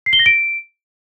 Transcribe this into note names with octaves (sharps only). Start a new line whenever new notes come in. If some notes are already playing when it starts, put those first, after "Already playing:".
C7
G7
A#6
D7